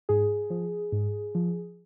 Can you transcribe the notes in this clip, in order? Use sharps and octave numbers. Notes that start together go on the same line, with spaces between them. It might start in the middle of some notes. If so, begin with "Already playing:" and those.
G#2 G#4
F3
G#2
F3